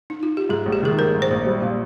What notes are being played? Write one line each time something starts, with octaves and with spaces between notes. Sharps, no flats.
D#4
F4
G4
G#2 G#4
A#1
G4
D#3 G#4
A#1 A#4
G#2
C5
A#1
G3
A#2